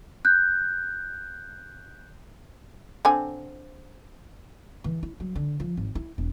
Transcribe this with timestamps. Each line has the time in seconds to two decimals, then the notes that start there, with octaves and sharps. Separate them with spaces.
0.25 F#6 G6
3.05 D3 C4 G#5
4.84 E3
5.03 E4
5.20 F#3
5.36 D3
5.60 F3
5.77 G#1
5.95 E4
6.18 E1